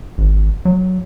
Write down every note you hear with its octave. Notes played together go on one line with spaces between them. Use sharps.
G#1
F#3